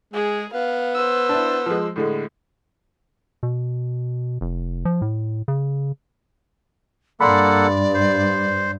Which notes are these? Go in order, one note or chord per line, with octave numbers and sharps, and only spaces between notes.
G#3 G#4
B3 F5
C5 E6
D4 E4
F3 G#3
A2 D3 G#3
B2
F1
F3
A2
C#3
G2 A#3 A4 D5 F#5 B5 C6
C5